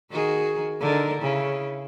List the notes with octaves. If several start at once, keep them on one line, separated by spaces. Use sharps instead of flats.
D#3 F#4 G#4
D3 D#4 A#4
C#3 E4